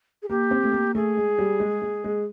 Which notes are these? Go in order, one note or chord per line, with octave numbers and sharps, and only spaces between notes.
G#4
A#3 G4
C4
A3
A#3
A3 G#4
G#3
G3
G#3
G#3
G#3